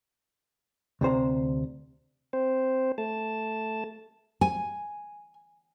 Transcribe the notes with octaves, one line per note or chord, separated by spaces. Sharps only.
D2 C3 C5 A#5
C4 C5
A3 A5
G#5